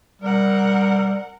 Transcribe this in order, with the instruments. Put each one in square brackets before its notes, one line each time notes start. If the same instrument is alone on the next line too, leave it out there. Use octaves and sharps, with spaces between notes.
[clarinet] G3 [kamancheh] A#4 F#5